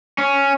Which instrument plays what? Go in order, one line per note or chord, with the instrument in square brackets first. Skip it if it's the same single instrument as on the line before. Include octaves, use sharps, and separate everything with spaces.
[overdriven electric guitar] C#4